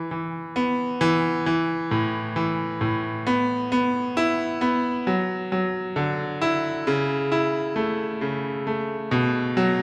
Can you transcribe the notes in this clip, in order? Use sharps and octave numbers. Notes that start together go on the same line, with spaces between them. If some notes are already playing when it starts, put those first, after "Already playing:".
Already playing: E3
E3
B3
E3
E3
A2
E3
A2
B3
B3
E4
B3
F#3
F#3
D3
E4
C#3
E4
A3
C#3
A3
B2
F#3